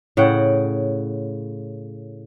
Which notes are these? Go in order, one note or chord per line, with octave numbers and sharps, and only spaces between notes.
A2 C#3 F#5 G5